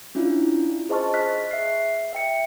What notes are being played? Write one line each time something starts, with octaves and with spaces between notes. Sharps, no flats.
C#4 D4 E4 F4
G#4 C5 D#5 A5 C#6 F6
D#5 F6 F#6 B6
E5 C7
E5 G5 C#7